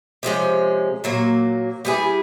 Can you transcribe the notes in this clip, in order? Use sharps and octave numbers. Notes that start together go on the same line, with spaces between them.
C3 F3 G#3 C#4
A#2 F#3 A#3
G3 B3 E4 G#4